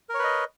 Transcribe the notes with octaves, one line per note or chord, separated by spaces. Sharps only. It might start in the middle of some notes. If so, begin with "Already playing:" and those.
A#4 B4 C#5 D#5